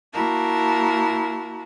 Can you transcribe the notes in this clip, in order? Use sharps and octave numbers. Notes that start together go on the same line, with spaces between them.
A#3 E4 F#4 A#4 A5